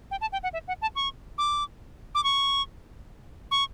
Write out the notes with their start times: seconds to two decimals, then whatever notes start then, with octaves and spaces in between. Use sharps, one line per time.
0.11 G5
0.21 A5
0.32 G5
0.43 F#5
0.53 E5
0.68 F#5
0.82 A5
0.96 C#6
1.38 D6
2.15 D6
2.24 C#6
3.51 C#6